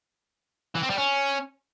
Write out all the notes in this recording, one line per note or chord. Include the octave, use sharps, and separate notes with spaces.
E3
C4
G3
C#4